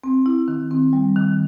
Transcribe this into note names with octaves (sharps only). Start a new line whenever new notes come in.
C4
E4
D#3
C4
G3
D#3